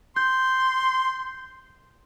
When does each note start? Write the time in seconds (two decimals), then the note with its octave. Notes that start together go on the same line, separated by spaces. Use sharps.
0.16 C6 G6